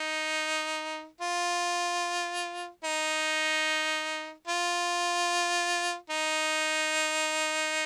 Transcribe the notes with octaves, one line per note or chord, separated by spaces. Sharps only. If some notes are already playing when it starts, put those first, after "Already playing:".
Already playing: D#4
F4
D#4
F4
D#4